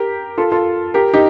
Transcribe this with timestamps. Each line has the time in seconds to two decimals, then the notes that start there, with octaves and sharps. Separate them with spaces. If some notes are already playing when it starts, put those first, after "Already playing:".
Already playing: G4 A#4
0.38 F4 A4
0.52 F4 A4
0.94 G4 A#4
1.14 D#4 G4